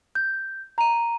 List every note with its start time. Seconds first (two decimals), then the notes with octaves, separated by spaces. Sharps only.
0.15 G6
0.78 A#5 D#7